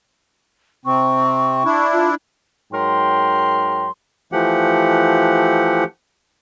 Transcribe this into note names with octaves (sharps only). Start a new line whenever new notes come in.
C3 C4 C#6
D4 E4
F4
G#2 F#3 A#4 G5 C6
E3 F3 A3 G4 F#5